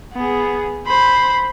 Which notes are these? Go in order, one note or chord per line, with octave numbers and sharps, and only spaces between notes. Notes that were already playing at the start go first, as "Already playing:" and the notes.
B3 G#4
C5 B5